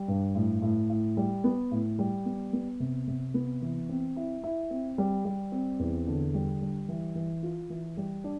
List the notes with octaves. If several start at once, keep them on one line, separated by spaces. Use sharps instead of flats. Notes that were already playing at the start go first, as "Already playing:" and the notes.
Already playing: G3
G2
A2
A2
A2
G3
B3
A2
G3
B3
B3
C3
C3
B3
E3
C4
E4
E4
C4
G3
G3
C4
E2
D3
G3
G3
E3
E3
F4
E3
G3
D4